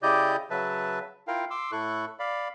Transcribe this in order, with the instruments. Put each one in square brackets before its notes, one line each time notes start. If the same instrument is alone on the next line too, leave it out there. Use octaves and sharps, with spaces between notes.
[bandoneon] C#3 E4 G4 D5 D#5 G6
C#3 F#3 B4 E5 A5
E4 F4 A#4 F5 G5
C6 D6 E6
A2 E4 A4 C#6 F#6
D5 F5 B5